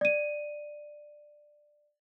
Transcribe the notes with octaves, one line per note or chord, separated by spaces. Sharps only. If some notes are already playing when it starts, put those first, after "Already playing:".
D5 D#7